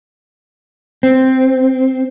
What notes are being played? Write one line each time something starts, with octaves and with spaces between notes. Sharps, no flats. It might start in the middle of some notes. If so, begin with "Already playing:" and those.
C4